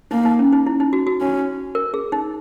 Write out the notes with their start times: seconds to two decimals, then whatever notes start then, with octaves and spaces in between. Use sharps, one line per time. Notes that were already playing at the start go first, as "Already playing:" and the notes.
0.11 A#3 D#4
0.25 D#4
0.39 C#4
0.53 D#4
0.67 E4
0.80 D#4
0.93 F#4
1.07 F#4
1.21 C#4
1.75 A#4
1.94 G#4
2.12 D#4